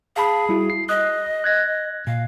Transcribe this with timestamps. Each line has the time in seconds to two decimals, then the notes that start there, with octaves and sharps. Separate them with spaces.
0.16 G#4 F5 A5 B5
0.49 G3 E4 F#4
0.70 C7
0.89 D#5 D#6 F#6
1.44 F#6 G#6 A#6
2.07 A#2 F5